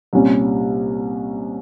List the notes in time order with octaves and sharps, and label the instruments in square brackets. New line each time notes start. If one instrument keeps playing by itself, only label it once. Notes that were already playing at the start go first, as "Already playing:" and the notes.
[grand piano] C2 A#2 G3 C#4